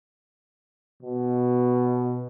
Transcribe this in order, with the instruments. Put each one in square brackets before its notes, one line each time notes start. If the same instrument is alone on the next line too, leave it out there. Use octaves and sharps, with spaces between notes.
[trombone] B2